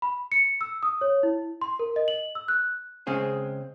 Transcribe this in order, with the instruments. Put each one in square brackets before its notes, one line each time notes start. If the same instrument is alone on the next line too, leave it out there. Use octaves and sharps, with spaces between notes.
[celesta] B5
C#7
E6
D#6
C#5
E4
C6
A#4
D#5
F#7
E6
F#6
[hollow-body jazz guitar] C#3 G#3 C4 G#4